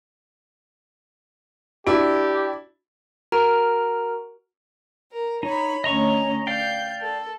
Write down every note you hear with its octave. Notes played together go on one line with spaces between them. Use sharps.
D4 E4 F#4 G4
F#4 A#4 A#5 F6 D7
A#4
D#4 C#5 B5
D2 C#4 C#5 D#5 A#5 C#6
D5 F5 G5 G6
A4